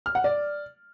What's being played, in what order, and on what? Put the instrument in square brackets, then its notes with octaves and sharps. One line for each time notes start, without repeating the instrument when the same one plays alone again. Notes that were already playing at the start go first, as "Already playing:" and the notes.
[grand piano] F6
F#5
D5